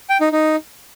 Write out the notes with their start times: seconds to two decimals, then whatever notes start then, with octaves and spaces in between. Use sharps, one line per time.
0.10 G5
0.21 D#4
0.32 D#4